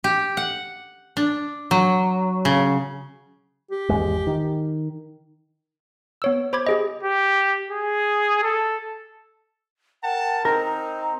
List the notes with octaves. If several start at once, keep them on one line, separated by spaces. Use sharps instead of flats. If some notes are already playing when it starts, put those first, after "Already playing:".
G4
F#5
D4
F#3
C#3
G4
G#1 E2 G#3
D#3
B3 C#5 E6
C5 B5 D6 G#6
G4 G#4 D#5
G4
G#4
A4
A#4 F#5 G5 A5
C4 D#4 A#4 A#5